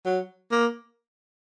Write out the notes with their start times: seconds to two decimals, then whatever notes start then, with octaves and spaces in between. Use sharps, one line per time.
0.05 F#3
0.52 A#3